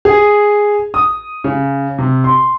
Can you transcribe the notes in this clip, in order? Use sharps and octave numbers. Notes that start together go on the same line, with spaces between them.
G#4
D#6
C#3
C3
C6